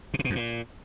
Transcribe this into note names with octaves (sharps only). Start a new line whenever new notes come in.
B2
C3
B2
F2
A#2